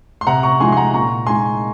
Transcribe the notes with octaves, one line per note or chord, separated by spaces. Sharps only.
C6
C3 F#5 A#5
A#5 C#6
F3 G#3 D#4 G#5 C6
C6
F#5 A#5
A#2 A#5 C#6
G#3 D#4 G#5 C6